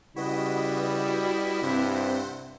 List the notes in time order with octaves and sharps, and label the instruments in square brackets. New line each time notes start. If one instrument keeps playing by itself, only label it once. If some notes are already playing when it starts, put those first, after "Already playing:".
[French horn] C#3 [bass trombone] G3 [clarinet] E4 [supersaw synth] F#4 B4 D#5
[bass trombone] G2 [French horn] C3 [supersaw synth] C4 C5 F#5